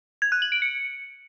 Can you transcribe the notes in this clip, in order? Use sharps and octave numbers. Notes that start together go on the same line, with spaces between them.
G#6
F#6
F#7
D7
C#7